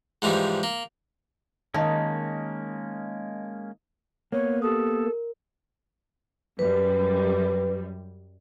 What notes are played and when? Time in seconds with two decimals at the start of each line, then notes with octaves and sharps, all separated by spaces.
0.22 G#2 E3 F3 G3
0.63 A#3
1.74 D#3 G#3 A#3 C#4 D#4 D#5 A5
4.32 A#3 B3 C#5
4.62 G4 A4 D#6
5.05 A#4
6.59 F#2 G3 B4